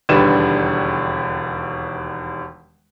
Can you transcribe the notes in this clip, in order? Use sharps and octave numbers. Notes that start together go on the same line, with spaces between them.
E1 D#2 D3 G3 B4 E7